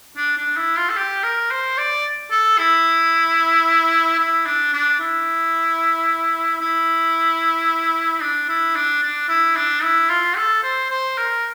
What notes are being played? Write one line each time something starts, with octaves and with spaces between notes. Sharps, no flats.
D4
D4
E4
F4
A4
G4
A#4
C5
D5
A4
E4
E4
D4
D4
E4
E4
D4
E4
D4
D4
E4
D4
E4
F4
A4
C5
C5
A#4